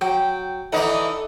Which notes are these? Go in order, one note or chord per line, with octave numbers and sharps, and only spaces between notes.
F#3 G5
E3 D#4 A4 D5 F#5